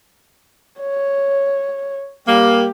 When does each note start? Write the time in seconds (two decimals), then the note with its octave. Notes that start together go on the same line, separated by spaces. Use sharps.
0.80 C#5
2.28 G3 A#3 G4